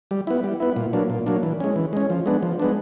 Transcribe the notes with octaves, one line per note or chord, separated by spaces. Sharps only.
G3
B3 E4
G3
B3 E4
A#2
F#3 A#3 D4
A#2
F#3 A#3 D4
E3
G#3 C#4
E3
G#3 C#4
F3
G#3 B3 D4
F3
G#3 B3 D4